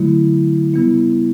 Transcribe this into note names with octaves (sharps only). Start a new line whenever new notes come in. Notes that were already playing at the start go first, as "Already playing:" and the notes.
Already playing: D3 F#3 A3 E4
C#3 G3 B3 E4